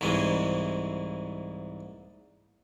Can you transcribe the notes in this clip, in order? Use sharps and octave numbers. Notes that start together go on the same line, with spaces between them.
C2 G#2 E3 G#3